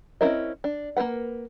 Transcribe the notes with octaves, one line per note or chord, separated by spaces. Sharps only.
C4 C#4 E4 A#4 D#5
D4
A#3 E4 A#4 B4 F#5